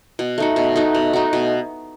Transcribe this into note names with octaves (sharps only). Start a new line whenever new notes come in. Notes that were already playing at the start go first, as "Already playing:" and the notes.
B2
A3 D#4 F#4
B2
A3 D#4 F#4
B2
A3 D#4 F#4
B2